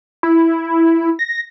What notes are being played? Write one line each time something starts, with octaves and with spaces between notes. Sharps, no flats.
E4
A#6